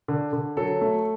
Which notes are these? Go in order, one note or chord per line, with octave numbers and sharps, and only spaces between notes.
D3
D3
F#3 A4
A3